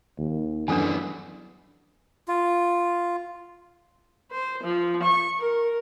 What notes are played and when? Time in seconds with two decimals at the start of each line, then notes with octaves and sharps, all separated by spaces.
0.18 D#2
0.68 F#2 E3 G3 B3 D4 A4 G#5
2.28 F4
4.31 C5
4.64 F3
5.03 C#6
5.39 A#4